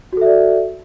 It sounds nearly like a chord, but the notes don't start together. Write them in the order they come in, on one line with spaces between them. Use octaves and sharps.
F#4 A4 E5 D5